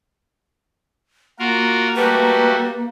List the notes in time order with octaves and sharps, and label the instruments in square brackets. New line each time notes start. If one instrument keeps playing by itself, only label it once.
[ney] A#3 [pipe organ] F4 F#4 A#4
[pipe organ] G3 A3 F#4 [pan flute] B4